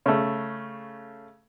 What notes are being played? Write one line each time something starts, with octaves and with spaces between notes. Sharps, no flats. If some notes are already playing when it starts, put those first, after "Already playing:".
C#3 A3